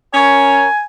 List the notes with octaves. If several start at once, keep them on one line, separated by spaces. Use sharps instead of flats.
C#4 A#4 C#5 G#5